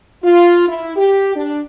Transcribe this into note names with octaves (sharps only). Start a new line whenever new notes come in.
F4
E4
G4
D4